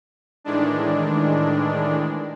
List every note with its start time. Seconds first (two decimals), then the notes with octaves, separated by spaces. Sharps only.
0.44 A2 D#3 E3 G#3 D4